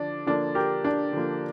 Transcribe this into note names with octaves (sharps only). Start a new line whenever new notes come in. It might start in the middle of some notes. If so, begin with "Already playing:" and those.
Already playing: D3 F3 D4
D3 F3 A#3 D4
G4 A#4
D4
D3 F3 A#3